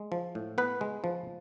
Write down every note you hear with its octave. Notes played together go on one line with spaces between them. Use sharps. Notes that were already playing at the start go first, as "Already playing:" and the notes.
Already playing: G#3
F3
A2
B3 B4
G#3
F3